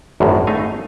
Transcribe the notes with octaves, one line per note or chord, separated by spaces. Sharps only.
G#1 F#2 A2
A3 D#4 F5 G#5